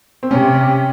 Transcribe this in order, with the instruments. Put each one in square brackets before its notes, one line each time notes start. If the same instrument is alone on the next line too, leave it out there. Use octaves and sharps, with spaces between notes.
[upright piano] C4
[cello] C3 [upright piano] C#4